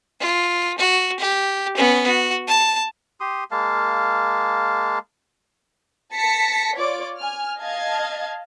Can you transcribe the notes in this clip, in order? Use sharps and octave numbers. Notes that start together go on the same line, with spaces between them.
F4
F#4
G4
B3 C#4
F#4
A5
G4 C6 D#6
G#3 A#3 F5 A5
A5 A#6 B6 C#7
F4 C#5 D5 D6
G#5 F6
D#5 F5 A5 G#6